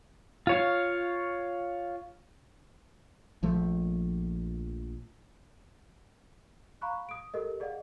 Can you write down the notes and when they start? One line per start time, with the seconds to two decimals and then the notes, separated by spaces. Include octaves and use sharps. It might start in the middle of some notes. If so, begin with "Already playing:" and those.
0.47 F4 C#5 F5
3.43 A#1 F3 A3
6.81 F5 A#5 B5 C#6 F#6
7.09 D#6 D7
7.34 G4 A4 A#4 D#5
7.60 G#4 D5 D#5 F5 F#5